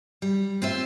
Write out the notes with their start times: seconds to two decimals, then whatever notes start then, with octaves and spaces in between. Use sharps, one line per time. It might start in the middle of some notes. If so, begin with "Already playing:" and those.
0.22 G3
0.62 C4 F4 C5 E5